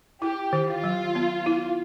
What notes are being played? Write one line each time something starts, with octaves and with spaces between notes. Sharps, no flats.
E4 G4
D#3
F4
F#3
B3
E4